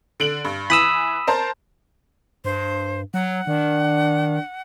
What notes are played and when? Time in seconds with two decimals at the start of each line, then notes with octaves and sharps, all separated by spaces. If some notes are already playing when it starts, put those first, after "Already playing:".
0.20 D3 D7 F#7
0.45 G2
0.70 E3 B5 D#6 E6
1.27 A#4 C5 A5
2.45 G2 C5
3.14 F#3 F#5
3.47 D#3 D4